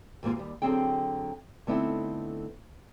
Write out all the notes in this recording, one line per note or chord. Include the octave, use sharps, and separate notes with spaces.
D#2 G#2 A#3 F4
D#2 G3
D3 F#3 C4 G#4 G5
D3 A3 B3 C4 D#4 E4